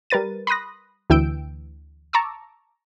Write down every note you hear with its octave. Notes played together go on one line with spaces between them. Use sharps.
G3 A#4 B4 A6 D#7
B5 C6 D#6 F#6 A#6
D2 E3 G5 E6 G6 D7
A5 A#5 C#6 D6 E6